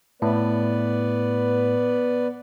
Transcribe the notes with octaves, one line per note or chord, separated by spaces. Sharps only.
A2 B3 B4 D5